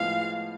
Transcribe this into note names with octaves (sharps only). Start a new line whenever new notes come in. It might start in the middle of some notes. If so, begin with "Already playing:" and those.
Already playing: A2 F3 G#3 B3 F5